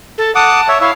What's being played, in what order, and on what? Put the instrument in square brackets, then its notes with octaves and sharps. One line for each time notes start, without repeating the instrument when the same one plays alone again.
[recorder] A4
[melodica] F#5 D6 D#6 [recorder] A5
[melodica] C#5 E5
[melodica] E4 C#5 E5 [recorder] F5